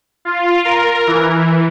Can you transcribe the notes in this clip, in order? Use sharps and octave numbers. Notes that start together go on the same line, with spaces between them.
F4
A#4
E3